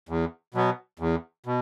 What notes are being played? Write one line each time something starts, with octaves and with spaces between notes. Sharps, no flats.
E2
B2 F#3 B3
E2
B2